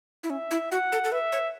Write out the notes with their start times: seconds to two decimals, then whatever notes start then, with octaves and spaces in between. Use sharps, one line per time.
0.23 E4
0.30 C#4 E5
0.51 E4
0.71 F#4 F#5
0.92 A4
1.04 A4
1.12 B4 E5
1.32 C#5